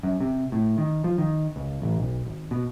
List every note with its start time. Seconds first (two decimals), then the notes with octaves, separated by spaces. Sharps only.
0.03 F#2
0.21 C3
0.52 A2
0.78 D#3
1.04 F3
1.18 D#3
1.56 C#2
1.82 A1
1.97 B1
2.26 G#1
2.51 B2